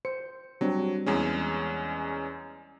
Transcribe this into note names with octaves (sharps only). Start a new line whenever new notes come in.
C5 C#7
F#3 G3 C4 D4
E2 G#3 C#4